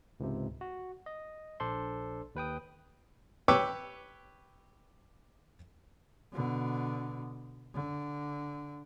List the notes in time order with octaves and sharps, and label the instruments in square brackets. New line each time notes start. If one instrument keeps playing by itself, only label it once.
[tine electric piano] C#2 G#2 C3
F#4
D#5
A#1 D4 A4 C5 D5 C6
D#2 B4 G5 D#6
[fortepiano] G4 B4 C#5 D6 E6
[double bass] B2 D3
D3